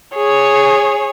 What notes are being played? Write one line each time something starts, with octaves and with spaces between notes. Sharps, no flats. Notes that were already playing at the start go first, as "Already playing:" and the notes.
G#4 C#5